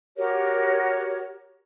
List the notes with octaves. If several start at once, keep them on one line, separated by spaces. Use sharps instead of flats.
F#4 G4 A#4 C#5